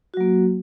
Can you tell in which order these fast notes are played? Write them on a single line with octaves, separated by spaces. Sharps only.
F#4 F#3 A#3